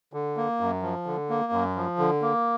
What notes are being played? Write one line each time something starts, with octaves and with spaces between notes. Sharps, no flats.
D3
A#3
F#2
F3
D3
A#3
F#2
F3
D3
A#3